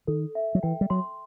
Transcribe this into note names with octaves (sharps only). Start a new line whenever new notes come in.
D#3 A4
E5
F#3
E3 G5
G3
F#3 C6